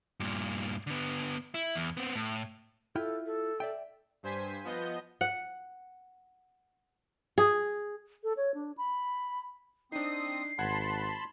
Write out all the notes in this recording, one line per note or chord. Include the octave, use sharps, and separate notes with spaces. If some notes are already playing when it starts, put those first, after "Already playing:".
G2 A#2
D3 B3
E4
E2
B3 C4
A2
E4 F4 A4 G5
A4
D5 E5 G5
G2 C5 G#5 B6
F3 B3 D#5 G6
F#5
G#4
A4
C#5
D4
B5
C4 D4 D#4 D#6 C7
G#1 F#5 A5 B5 C6 G#6